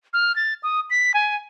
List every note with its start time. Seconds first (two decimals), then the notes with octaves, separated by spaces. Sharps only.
0.13 F6
0.36 A6
0.63 D#6
0.90 B6
1.14 G#5